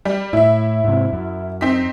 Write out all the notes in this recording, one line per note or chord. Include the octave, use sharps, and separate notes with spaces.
G3
A2 E4 E5
G#2 C3
F#2
C4 D#4 B6